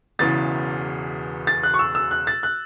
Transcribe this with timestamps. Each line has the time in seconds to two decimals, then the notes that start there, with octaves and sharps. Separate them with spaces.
0.19 E1 E2 C#3 E3 A6
1.47 A6
1.63 F#6
1.74 C#6
1.79 E6
1.95 E6
2.11 F#6
2.27 A6
2.43 F#6